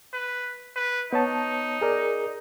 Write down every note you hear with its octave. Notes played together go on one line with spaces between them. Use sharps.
B4
B4
B3 D#4 C#5 A5
G#4 A#4 D5